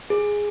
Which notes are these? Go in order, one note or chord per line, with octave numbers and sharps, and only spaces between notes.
G#4